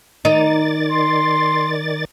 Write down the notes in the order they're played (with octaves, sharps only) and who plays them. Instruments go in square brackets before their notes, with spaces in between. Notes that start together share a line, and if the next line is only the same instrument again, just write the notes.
[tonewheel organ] D#3 D5 A6 [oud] D#4
[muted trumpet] C6